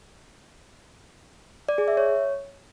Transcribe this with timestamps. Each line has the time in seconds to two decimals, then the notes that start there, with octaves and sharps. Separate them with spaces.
1.69 D5
1.78 G#4
1.88 E5
1.97 C#5